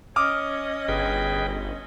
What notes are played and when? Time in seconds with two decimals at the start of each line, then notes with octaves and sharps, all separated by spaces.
0.16 C#4 D#5 D6 D#6 F6
0.88 G1 G#4 B4 G5